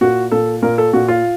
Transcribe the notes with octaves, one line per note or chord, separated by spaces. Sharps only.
A#2 F#4
A#2 A4
A#2 A#4
A4
A#2 F#4
F4